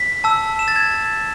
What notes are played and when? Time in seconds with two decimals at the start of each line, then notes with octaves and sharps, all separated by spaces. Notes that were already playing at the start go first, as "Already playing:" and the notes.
Already playing: B6
0.24 A5 E6
0.59 E7
0.68 A6
0.76 G#6